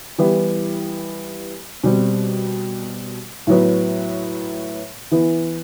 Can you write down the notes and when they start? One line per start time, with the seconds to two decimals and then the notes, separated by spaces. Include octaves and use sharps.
0.18 E3 G3 B3 E4 G4
1.84 B2 G3 C4
3.47 A2 F#3 B3
5.11 E3 B3 E4